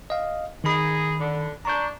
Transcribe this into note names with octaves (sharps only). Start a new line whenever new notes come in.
D#5 F5
D#3 D#4 G#4 B5
D3
D4 A#5 C#6 G6